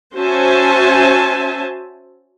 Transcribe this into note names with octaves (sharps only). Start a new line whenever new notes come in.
C#4 F#4 C5 E5 G#5 A5